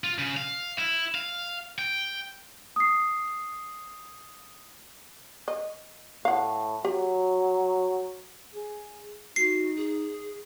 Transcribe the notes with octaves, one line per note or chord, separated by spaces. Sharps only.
F4
C#3
F5
E4
F5
G5
D#6 C7
D#5
A2 F5 F#5
F#3 G4
G#4
D#4 F#4 C7
G#4